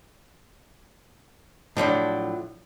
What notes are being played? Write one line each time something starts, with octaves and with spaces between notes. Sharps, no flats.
A2 F3 F#3 D4